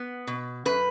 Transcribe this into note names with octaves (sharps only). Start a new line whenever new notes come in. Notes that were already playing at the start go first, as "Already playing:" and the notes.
Already playing: B3
B2
F#2 B4